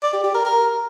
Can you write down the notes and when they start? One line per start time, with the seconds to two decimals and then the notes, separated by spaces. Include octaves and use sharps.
0.03 D5
0.13 G4
0.24 G4
0.35 A#4
0.45 A#4